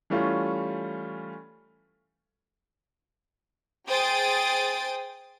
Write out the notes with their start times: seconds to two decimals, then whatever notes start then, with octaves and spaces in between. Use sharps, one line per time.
0.10 E3 G3 A3 C#4 F4
3.88 G#4 C5 G5 D#6 A6 D7